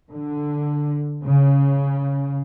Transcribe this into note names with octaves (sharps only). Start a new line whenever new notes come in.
D3
C#3